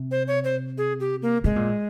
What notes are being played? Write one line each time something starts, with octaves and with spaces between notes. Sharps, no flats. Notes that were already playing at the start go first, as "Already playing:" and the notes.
Already playing: C3
C5
C#5
C5
G#4
G4
A#3
C3 G#3
A#2